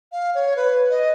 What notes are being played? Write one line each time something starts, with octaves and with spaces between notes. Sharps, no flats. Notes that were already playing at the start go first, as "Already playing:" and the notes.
F5
C#5
B4
D#5